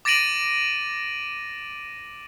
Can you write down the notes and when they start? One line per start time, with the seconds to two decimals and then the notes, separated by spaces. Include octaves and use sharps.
0.05 D6 A6 A#6 D7 D#7 F#7